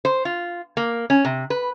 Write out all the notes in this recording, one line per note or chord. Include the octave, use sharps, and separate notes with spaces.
C5
F4
A#3
C#4
C3
B4